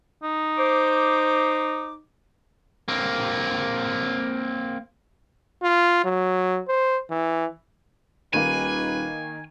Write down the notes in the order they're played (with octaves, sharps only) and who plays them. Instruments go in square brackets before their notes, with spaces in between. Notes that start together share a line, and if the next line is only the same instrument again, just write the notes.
[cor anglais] D#4
[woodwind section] C5 D6
[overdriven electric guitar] A#3 C4
[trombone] F4
F#3
C5
E3
[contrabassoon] D#1 [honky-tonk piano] D#3 A#3 [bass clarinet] B4 [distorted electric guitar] G#5